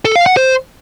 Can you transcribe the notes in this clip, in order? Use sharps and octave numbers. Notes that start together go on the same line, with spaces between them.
A4
F5
F#5
C5